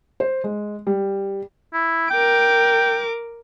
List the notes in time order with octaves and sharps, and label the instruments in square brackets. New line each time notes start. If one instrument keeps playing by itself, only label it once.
[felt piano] C5
G#3
G3
[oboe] E4
[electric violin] A#4 D6 [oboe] G5